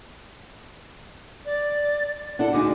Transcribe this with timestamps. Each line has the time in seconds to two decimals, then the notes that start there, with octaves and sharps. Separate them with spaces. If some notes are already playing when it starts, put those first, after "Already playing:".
1.45 D5
2.39 D4 E4 A4 F#5
2.53 D2 D#4 G#4 D6